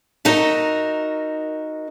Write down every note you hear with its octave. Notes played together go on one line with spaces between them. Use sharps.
D#4 F#4 A#4 E5